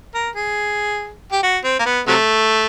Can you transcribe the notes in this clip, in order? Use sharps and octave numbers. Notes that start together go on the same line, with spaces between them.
A#4
G#4
G4
F#4
C4
A#3
B3
C3 F#3 A3